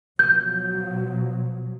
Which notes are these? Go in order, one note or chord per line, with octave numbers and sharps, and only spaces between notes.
B2 F3 F#3 G6